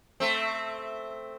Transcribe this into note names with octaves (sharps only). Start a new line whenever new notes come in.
A3 C4